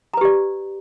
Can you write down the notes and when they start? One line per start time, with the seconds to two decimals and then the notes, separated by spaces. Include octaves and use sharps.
0.14 A#5
0.17 B4
0.21 G4
0.25 D5